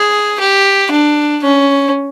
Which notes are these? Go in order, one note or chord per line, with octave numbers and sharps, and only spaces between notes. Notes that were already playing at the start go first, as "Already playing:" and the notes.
Already playing: G#4
G4
D4
C#4